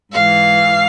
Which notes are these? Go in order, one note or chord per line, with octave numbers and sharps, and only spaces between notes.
G#2 E3 F5